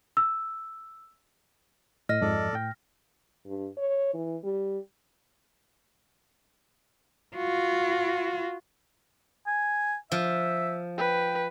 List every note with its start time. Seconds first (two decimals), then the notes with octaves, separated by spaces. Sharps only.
0.17 E6
2.09 A2 D#5 F6 A#6
2.21 F2 G#2 F3 A4 D5
2.53 A2 G5
3.46 G2
3.77 C#5
4.14 E3
4.44 G3
7.36 F4 F#4
9.47 G#5
10.12 F3 E5
10.98 B4 G5